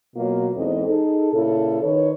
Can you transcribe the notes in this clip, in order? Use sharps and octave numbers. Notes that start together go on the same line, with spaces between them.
B2 F#3 A#3 F4
E2 G#2 C4 A4 D#5
D#4 G#4 A4
A#2 C#3 E4 A4
D#3 B4 C#5